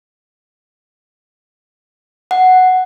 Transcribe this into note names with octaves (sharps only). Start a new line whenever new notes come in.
F#5